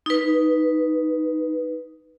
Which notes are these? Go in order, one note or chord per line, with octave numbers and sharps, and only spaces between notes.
D#4 B4